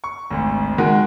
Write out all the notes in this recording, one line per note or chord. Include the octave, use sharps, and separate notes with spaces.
C#6
G#1 D2
D#3 G#3 F#4